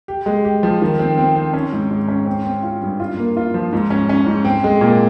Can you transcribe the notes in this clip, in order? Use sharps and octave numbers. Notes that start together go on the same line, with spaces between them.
G4
G#3
G4
F3
D#3
C4
C4
C4
C#4
G#2
G#2
C#4
C4
C4
F4
G2
F4
A#3
F4
F3
G#2
C#4
C#4
G#2
C4
G#3
A#2